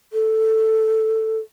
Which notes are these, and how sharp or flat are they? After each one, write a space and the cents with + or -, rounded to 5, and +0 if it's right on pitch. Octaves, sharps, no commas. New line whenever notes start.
A4 +5